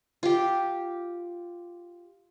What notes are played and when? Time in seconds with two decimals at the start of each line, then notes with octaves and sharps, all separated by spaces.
0.23 F4 G4